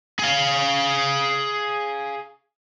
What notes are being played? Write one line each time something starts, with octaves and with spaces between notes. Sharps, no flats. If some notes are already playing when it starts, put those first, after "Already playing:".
G#4 F5